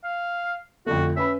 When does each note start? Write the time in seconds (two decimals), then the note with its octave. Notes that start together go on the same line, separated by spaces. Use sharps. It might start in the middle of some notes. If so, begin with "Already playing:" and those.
0.04 F5
0.86 F2 D3 A3 F#4
1.17 C#4 B4 E5 B5